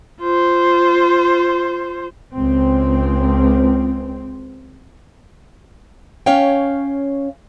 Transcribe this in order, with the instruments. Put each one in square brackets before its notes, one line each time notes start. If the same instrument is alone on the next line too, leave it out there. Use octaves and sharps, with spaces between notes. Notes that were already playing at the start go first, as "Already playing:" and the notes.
[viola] F4 C5
[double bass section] C#2 C4
[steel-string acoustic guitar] C#4 C#5 F5 G5